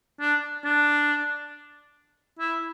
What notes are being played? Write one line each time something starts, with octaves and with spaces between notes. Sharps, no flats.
D4
D4
E4